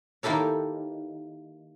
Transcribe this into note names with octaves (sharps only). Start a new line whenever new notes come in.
D#3 A#3 E4 G4 A4 C#5